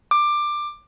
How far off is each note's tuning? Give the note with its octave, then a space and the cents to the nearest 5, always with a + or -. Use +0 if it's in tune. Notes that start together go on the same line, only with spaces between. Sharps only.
D6 +15